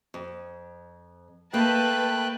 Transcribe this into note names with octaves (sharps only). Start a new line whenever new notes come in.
F2
A3 A#3 B4 D#5 G5 A5 F#6